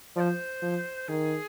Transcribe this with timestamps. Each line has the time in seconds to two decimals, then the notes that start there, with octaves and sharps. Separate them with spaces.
0.16 F3 C5 D5
0.62 F3
1.08 D#3 G#4